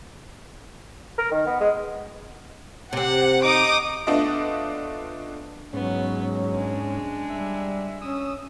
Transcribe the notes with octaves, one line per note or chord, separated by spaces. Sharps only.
A#4
D#3
B3
G#3
C3 C4 F#5
D#4 D6 D#6
A3 B3 D4 F4 D#5
G#2 F#3 B3 C#4
G#3 D4
G3 E5
C#4 D#6 E6